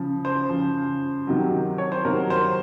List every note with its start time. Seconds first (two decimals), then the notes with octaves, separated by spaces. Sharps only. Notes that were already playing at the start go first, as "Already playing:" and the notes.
Already playing: C#3 F3
0.25 C5
0.50 C#3 F3
1.27 C3 D#3 F#3
1.78 C#5
1.92 C5
2.05 C3 D#3 F#3 A#4
2.30 C5